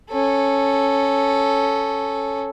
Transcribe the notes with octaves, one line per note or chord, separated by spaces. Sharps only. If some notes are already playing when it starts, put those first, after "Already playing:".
C#4 A4